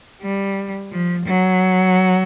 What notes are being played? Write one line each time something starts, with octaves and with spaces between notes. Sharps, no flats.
G3
F3
F#3